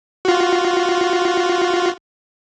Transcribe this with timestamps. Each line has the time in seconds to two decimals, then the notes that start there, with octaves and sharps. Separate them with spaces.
0.25 F4 F#4